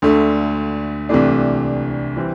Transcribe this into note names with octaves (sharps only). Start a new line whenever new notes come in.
D2 D3 A3
C2 C3 E3 A3 D4
E3 G3 C4